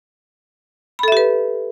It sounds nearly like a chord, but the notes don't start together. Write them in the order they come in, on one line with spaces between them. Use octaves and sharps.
B5 A4 E5 G4 B4